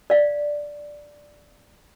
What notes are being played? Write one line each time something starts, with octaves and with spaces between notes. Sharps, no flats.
D5 F5